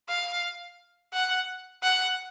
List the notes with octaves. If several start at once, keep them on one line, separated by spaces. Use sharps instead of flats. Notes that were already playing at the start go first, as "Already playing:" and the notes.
F5
F#5
F#5